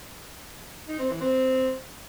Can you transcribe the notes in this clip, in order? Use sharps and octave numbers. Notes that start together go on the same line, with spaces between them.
D#4
C4
E3
C4